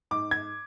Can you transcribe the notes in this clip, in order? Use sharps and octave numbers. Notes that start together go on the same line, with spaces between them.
G#2 D6
G#6